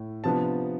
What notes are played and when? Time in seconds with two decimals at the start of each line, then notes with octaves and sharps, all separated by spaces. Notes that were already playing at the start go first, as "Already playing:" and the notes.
Already playing: A2
0.24 C3 F3 B3 D4 A5